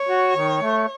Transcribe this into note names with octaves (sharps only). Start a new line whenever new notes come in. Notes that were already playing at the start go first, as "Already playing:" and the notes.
Already playing: C#5
F#4
D#3
A3